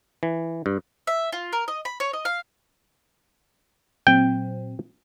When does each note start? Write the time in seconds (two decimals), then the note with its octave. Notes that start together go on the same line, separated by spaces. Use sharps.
0.23 E3
0.66 G2
1.07 E5
1.32 F4
1.53 A#4
1.68 D#5
1.85 B5
2.00 C#5
2.13 D#5
2.25 F5
4.07 A#2 F#3 C4 G5